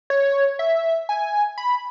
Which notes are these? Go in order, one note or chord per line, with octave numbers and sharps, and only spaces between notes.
C#5
E5
G#5
B5